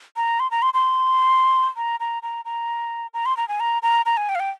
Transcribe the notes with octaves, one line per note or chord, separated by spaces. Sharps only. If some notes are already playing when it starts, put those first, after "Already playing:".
A#5
C6
A#5
C6
C6
A#5
A#5
A#5
A#5
A#5
C6
A#5
G#5
A#5
A#5
A#5
G#5
G5
F5
G5